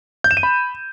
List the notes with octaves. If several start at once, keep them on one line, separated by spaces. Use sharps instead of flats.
G6
E7
D#7
B5